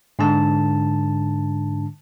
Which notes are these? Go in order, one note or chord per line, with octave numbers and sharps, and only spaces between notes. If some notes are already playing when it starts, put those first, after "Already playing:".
G#2 D3 A5